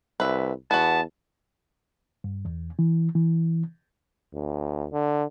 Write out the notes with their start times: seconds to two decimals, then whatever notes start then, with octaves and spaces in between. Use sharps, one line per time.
0.20 C2 B4 E5
0.71 E2 B3 F#4 A5
2.24 G2
2.45 E2
2.79 E3
3.15 E3
4.34 D2
4.92 D3